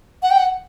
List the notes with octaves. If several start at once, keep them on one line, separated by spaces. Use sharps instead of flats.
F#5
G5
F#5